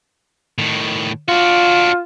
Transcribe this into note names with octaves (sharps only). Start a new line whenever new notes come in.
A2 D#3
D4 F4 F#4